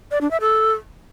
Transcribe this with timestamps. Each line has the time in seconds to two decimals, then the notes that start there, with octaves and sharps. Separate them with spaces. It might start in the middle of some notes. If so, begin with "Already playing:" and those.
0.11 D5
0.21 D4
0.31 E5
0.41 A4